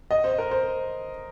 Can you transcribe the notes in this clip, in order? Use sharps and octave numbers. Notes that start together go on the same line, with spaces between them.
D#5
C5
A#4
C5